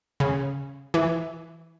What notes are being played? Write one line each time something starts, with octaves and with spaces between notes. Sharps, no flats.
C#3
E3